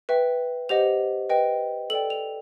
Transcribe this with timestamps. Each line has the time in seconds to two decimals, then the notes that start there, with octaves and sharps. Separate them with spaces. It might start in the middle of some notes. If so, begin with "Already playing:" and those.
0.09 B4 E5 G5
0.69 G4 C5 D#5 F#5 F7
1.29 B4 D#5 G5
1.90 A4 D5 G5 F#7
2.10 F7